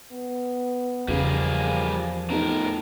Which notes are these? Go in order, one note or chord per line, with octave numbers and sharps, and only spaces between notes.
B3
E2 C#3 F3 G3 A#3 G#4
A2 B3 D#4 A4 A#4